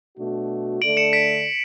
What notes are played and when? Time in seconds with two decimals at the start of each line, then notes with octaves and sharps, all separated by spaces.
0.17 B2 A3 D4 F#4
0.81 D3 A3 D4 A4 D5 D7 F#7
0.97 C#7 E7
1.13 B6 D7